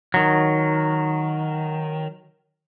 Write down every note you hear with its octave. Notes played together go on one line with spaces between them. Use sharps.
D#3 F#3